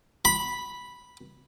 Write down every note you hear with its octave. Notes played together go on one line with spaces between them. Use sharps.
B5